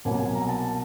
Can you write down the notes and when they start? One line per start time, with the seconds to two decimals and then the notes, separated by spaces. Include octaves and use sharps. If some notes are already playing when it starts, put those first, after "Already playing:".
0.05 C2 B2 F#3 A#3 G#5
0.15 G#5
0.25 G#5
0.35 A#5
0.49 A5